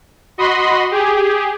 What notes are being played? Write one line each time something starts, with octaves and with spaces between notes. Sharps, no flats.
F#4 D#5 B5 C6
G4 G#4